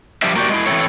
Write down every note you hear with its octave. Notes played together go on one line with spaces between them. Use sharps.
F3 G3 D4 G4 E5
A#3 F#4 G4 D5
G#3 E4
E3 C4 E4 A4 C#5